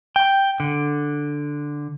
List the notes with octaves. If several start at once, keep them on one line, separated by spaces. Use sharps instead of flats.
G5
D3